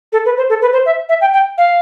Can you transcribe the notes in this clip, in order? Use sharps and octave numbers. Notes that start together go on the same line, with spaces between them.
A4
B4
C5
A4
B4
C5
E5
E5
G5
G5
F5